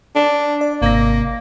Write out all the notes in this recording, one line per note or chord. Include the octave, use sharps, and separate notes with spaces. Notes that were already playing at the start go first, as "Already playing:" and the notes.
D4
D5
G#1 C3 A#3 A#6